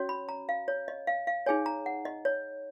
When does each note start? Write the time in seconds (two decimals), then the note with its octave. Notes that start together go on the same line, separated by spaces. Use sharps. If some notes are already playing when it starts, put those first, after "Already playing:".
Already playing: C#4 F#4 C#5
0.09 B5
0.29 A#5
0.49 F5
0.68 C#5
0.88 D#5
1.07 F5
1.27 F5
1.46 D#4 G#4 C#5 G#5
1.66 A#5
1.86 F#5
2.05 D#5
2.25 C#5